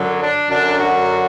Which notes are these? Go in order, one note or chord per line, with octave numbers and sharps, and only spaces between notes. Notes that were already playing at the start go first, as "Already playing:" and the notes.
Already playing: F#2 D3 F#3
D4
F#2 D3 F#3 D4
F#4